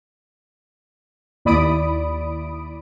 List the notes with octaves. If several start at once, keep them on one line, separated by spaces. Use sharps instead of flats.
D#2 E4 D5 B5 D#6 D7